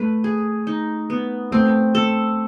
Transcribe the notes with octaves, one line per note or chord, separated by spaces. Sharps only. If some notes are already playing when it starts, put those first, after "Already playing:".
Already playing: A3 B4
G#4
D#4
B3
A3 C4
A4